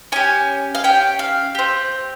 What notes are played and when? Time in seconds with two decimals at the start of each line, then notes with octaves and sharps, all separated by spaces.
0.12 C#4 G4 G#5
0.75 F5
0.84 C#4 G4 G5
1.19 F5
1.55 C4 G4